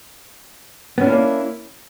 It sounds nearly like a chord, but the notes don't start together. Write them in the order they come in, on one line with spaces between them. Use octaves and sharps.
B3 C#4 D4 E4 A#3